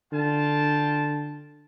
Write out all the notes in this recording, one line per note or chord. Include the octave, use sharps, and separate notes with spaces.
D3 F4 G5 A5